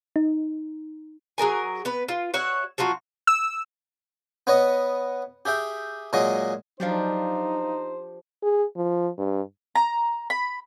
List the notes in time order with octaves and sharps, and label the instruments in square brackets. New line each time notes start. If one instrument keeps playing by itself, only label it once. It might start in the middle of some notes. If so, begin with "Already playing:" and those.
[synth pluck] D#4
[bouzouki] F#3 G#4 A#4 G#5
B3 B4
F4
F#4 C#5 E5 F#5
F3 F#3 F4 F#4
[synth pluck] E6
[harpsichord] B3 B4 C#5 D#5
G4 G#4 E5 G5
A#2 F#3 G#3 C#5 D#5
[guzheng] F3 D4 G4 [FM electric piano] F#3 F5 [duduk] D#4 [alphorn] C5
[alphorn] G#4
F3
G2
[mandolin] A#5
B5